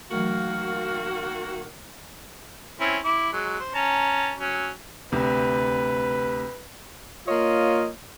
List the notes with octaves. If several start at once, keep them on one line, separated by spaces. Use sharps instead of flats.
D#3 E3 F#3 A3 A#3 F#4 F5
C4 C#4 E4
E4 D6
F#3 G#3
C5
C#4 A5 A#5
F#3 C#4
D2 C3 B4
A#3 F4 C#5 D#5